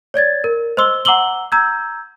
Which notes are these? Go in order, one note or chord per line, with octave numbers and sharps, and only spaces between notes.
C#5 D5 G#6 A6
A#4
C5 D#5 C6 E6 G7
F#5 A#5 D6 E6 F#7 G7
A#5 E6 G6 G#6